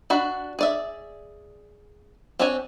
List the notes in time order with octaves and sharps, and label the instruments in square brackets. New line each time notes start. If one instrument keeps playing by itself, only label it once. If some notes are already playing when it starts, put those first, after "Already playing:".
[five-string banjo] D4 F#4 B5
G#4 D5 E5
C4 D4 G4 C#5 G#5